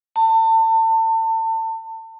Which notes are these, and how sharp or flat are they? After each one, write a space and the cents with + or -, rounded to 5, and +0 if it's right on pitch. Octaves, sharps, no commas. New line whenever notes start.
A5 +30